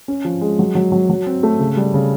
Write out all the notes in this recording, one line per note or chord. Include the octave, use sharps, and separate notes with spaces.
C#4
F3
G#3
F#3
F#3
F#3
F#3
C4
A3
C#3
G3
C#3